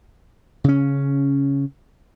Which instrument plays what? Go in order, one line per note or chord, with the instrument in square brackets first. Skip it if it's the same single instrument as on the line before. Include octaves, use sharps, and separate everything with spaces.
[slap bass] C#3 C#4